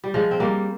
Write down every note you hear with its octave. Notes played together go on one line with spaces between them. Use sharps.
G3
F3 G#3
C4
G3 A#3